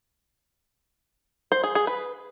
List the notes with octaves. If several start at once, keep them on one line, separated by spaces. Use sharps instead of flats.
C5
G#4
G#4
B4